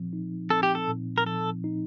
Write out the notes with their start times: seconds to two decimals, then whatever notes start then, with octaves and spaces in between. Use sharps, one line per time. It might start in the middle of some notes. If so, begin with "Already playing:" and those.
Already playing: A#2 F3 C4
0.13 D#4
0.50 C4 A4
0.63 G4
0.75 A4
0.88 A#2
1.18 A#4
1.26 F3 A4
1.64 D#4